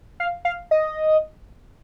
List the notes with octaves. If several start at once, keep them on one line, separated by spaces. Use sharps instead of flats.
F5
F5
D#5